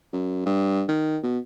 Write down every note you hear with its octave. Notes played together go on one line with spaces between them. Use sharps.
F#2
G2
D#3
B2